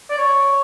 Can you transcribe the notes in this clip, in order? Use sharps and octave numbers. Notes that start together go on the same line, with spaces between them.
D5
C#5